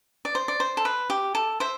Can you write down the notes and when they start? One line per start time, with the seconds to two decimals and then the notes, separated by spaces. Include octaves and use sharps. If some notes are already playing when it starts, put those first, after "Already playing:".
0.25 D5
0.35 C5
0.48 D5
0.60 C5
0.77 A4
0.85 B4
1.10 G4
1.35 A4
1.60 C5 E5